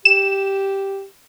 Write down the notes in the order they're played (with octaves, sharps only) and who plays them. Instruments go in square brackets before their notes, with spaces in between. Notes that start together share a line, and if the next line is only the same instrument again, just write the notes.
[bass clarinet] G4 [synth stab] E7